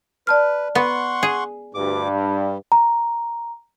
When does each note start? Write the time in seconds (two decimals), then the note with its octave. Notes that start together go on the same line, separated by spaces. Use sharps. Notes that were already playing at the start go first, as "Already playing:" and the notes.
0.27 B4 D5 A5 F6
0.75 B3 F#5 C6 C#6
1.23 G#4
1.74 D2 G2 D6
2.15 G3
2.72 A#5